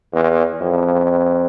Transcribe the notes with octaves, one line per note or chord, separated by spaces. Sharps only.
E2
F2